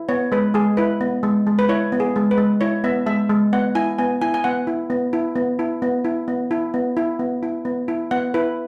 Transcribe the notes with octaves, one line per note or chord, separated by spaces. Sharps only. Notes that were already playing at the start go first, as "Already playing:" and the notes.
Already playing: E4
B3 C#5
G#3 B4
G#3 G#4
E4 B4
B3
G#3
G#3
B4
E4 C#5
B3
G#4
G#3
B4
G#3
E4 C#5
B3 E5
G#3 E5
G#3
B3 F#5
E4 G#5
B3 G#5
E4 G#5
G#5
B3 F#5
E4
B3
E4
B3
E4
B3
E4
B3
E4
B3
E4
B3
E4
B3
E4
B3 F#5
E4 B4